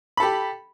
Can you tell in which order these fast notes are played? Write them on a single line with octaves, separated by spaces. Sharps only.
B5 A4 G4